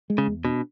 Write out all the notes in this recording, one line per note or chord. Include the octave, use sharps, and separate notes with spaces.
G#3
C#3
E2
B2 D4